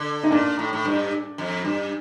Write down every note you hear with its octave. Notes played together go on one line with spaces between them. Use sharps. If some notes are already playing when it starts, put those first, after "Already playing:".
Already playing: D3
D#4
A#2 D4
A2
A2
G2
F2
G2